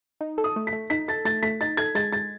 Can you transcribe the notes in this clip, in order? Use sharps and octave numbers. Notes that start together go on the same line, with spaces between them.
D#4
A4
D#6
A3
B6
A3
D#4 B6
A4 A6
A3 A6
A3 B6
D#4 A6
A4 G#6
G#3 A6
G#3 A6